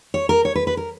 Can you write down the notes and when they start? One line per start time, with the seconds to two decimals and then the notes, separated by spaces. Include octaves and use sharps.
0.14 C#5
0.29 A#4
0.45 C#5
0.55 B4
0.67 B4
0.77 A#4